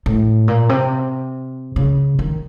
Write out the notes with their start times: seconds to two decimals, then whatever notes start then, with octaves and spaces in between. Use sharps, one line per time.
0.06 A2
0.48 A#2
0.69 C3
1.76 C#3
2.19 D#3